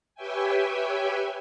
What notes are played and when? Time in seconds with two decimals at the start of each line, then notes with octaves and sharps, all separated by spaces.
0.15 G4 B4 C#5 E5 G5 G#5